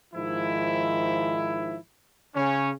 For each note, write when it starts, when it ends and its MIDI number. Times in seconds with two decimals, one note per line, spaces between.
0.14 1.77 44
0.14 1.77 51
0.14 1.77 53
0.14 1.77 64
2.35 2.71 49
2.35 2.71 61